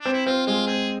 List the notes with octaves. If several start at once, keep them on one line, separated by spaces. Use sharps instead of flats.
C4 D4
E4
C4 F4
G#3 F4
C4 G#4